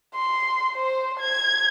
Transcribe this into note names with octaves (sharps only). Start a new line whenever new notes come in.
C6
C5
G#6